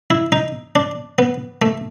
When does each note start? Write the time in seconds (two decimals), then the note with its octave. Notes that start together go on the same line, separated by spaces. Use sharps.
0.10 E4
0.32 D#4
0.76 D4
1.18 B3
1.62 A3